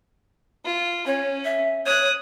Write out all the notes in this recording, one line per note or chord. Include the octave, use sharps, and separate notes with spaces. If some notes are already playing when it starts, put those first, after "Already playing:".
F4
C#4 C#5
E5
C#5 D#6 F#6